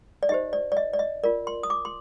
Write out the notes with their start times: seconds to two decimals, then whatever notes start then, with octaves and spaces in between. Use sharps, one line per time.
0.23 D5
0.29 D#4 G4 C5 D#5
0.53 D5
0.72 D5
0.77 D#5
0.93 D5
0.99 D#5
1.23 F4 A#4 D5
1.47 C6
1.63 D#6
1.70 D6
1.85 C6